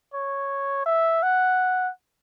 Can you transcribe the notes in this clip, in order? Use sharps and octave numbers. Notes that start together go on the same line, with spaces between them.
C#5
E5
F#5